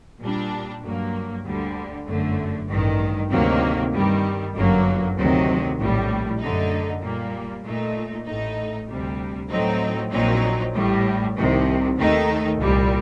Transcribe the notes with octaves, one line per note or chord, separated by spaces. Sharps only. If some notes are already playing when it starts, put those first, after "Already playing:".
A#2 G3 D4
G2 F#3 A#3
D2 D3 G3
G1 F#2 D3 A3
A1 G2 D#3
D2 C3 D#3 F#3 A#3
G2 D#3 G3
G1 F#2 F#3 A#3
D2 C3 D#3 F#3
A#1 A2 G3
F#2 D3 A3 D#4
A#2 G3 A#3
A#2 A3 D#4
A1 A2 A3 D#4
D2 C3 G3
A2 F#3 A3 C4 D#4
A#1 A#2 F#3 C4 D#4
A1 A2 G3
C2 C3 D#3
D#2 D#3 A3 D#4
C2 A#2 G3